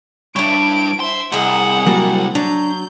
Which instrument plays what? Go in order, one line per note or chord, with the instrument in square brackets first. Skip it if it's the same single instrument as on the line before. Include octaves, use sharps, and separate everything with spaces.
[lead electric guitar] G3 D4 [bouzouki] E4 C#5 [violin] D7
[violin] C5 E5 [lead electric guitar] C6
[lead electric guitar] C2 [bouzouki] G#4 D#5 [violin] F#5
[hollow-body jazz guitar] F#3 G3 A#3
[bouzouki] F#3 [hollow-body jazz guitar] D4 [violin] G6